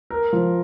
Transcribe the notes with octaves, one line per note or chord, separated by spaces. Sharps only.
A#4
F3